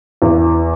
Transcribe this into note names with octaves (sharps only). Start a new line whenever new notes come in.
E2